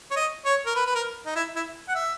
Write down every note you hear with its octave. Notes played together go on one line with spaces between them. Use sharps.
C#5
D#5
C#5
A#4
B4
B4
A#4
D#4
E4
E4
F#5
E5